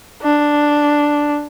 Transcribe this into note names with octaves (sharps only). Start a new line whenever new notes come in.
D4